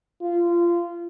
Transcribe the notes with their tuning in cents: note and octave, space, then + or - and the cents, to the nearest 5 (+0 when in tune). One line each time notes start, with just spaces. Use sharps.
F4 -20